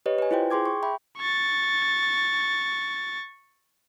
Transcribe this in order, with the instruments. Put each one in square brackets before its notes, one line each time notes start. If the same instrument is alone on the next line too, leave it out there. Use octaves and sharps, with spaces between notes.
[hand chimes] G4 B4 C#5 D#5
B4 G#5
E4 F4 C5 G5
G#4 G5 C6 D6 G#6
C#6
E5 G5 B5
[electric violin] C#6 A6